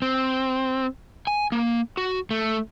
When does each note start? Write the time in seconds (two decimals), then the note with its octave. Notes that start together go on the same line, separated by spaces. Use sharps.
0.02 C4
1.27 G#5
1.52 A#3
1.97 F#4
2.31 A3